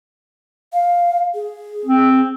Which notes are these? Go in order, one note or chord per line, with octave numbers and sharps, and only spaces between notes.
F5
G#4
C4